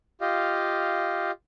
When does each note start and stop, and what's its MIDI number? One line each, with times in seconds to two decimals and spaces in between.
0.21 1.31 65
0.21 1.31 67
0.21 1.31 75
0.21 1.31 77